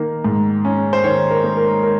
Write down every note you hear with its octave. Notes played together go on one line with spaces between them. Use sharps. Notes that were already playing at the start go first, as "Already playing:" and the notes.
Already playing: D#3 A#3
G#2
C#4
C5
D#3 C#5
A#4
A#3
A#4
A#4